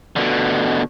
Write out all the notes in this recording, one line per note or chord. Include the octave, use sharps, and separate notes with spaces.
B2 D3